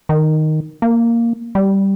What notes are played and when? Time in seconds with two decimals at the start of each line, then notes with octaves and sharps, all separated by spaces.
0.09 D#3
0.82 A#3
1.55 G3